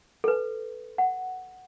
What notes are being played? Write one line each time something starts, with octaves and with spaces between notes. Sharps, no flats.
A4 B4
F#5